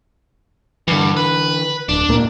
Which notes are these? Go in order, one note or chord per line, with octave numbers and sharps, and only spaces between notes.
G2 D3 E3
B4
D1 D4
C#2 A#2 A#3